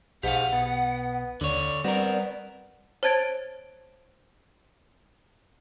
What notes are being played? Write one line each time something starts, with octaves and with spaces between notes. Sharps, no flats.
B1 G#2 G4 F5 F#5
B2 B3
D#2 D3 C#5 D5
G3 B3 C4 A#4
C5 C#5 A5 G#6 A6 D7